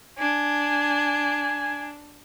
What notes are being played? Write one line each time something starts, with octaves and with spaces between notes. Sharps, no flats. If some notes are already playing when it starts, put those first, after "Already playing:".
D4 G#5